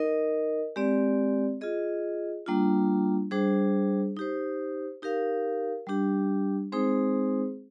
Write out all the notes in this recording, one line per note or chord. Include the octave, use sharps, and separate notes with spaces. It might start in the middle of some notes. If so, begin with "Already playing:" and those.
Already playing: D#4 A#4 D#5
G#3 C4 G4 D5
F4 G#4 D#5
G3 A#3 D4 F4
G3 D4 G#4 C5
D#4 G4 C5
D#4 G4 A#4 F5
G3 D4 G4
G#3 C4 D#4 G#4 C5